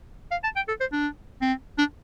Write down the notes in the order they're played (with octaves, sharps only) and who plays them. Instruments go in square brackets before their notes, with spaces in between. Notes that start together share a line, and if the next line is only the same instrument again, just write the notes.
[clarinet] F5
A5
G5
A4
C5
D4
C4
D4